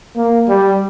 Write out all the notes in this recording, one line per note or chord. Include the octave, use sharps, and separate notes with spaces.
A#3
G3